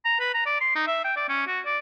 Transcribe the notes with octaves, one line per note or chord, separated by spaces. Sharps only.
A#5
B4
A#5
D5
C6
D#4
E5
G5
D5
C#4
F#4
D5